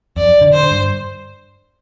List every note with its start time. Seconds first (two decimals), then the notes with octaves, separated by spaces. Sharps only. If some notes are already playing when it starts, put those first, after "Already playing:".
0.17 F2 D5
0.41 D3
0.53 D3 C5
0.71 G2